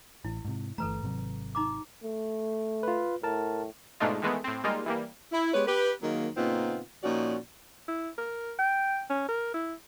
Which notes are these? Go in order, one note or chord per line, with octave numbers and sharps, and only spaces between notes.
A1 E4
G#2 C3
G1 E3 A3 A4 B4 A#5
G#1 C3 F#3
D#4 A#5 D6
A3
F4 B4
A2 A#4 A5
G#2 B2 A3 D4 D#4 F4
D#3 E3 G#3 A3 B3
A2 C4
G3 G#3 A#3 D#4 F4
E3 G3 A#3
E4
G#3 B3 G4 B4 C#5
G4 B4
D#3 F#3 G#3 A#3
A#2 C#3 B3 C4 D#4 F4
A#2 F3 C#4 D#4 F#4 D5
E4
A#4
G5
C#4
A#4
E4